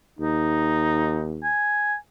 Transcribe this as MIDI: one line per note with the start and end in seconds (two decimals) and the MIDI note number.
0.19 1.52 39
0.19 1.35 63
1.43 1.96 80